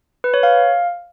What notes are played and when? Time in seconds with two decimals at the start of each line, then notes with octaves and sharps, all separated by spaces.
0.24 B4
0.34 C#5
0.43 F5